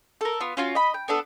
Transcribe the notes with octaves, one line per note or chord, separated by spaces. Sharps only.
A4 A#4
B3 F4
C#4 F4 F#4
D#5 B5
G5
B3 D4 A4